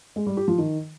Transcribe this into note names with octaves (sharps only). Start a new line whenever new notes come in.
G#3
G3
G4
F3
D#3